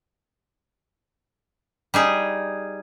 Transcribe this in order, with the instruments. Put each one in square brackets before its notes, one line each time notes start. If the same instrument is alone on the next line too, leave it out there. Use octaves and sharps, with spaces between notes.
[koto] G3 D#4 G#4